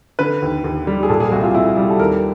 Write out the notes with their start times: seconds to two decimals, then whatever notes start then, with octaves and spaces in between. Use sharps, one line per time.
0.19 D3 B4
0.42 D#2
0.64 D#2
0.87 G3
1.03 G#4
1.09 A#2 A4
1.20 G#4
1.32 C2 F#4
1.43 F4
1.54 C2 E4
1.77 G3
1.90 A4
1.99 D#2 A#4